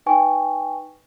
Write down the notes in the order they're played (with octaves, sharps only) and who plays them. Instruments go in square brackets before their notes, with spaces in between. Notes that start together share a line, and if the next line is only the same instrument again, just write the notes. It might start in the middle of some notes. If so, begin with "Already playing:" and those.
[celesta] D#4 B4 G5 G#5 C#6